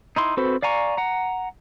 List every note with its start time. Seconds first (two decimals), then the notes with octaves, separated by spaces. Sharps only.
0.16 D#4 E4 C6
0.37 C4 F#4 A4 B4 C5
0.62 D5 F5 G#5 A#5 C#6
0.97 F#5 A#5